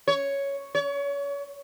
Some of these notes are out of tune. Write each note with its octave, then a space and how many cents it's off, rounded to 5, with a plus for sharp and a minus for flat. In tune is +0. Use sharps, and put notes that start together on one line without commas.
C#5 +5
C#5 +35